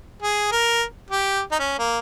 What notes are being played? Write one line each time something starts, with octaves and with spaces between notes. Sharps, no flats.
G#4
A#4
G4
D#4
C#4
A#3